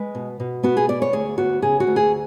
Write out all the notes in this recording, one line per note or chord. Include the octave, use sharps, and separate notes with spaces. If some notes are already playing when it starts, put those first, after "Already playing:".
Already playing: G#3 B4
B2
B2
B3 F#4
G#4
B3 D5
C#5
D2 G#4
B3 F#4
C#3 G#4
F#4
D2
G#4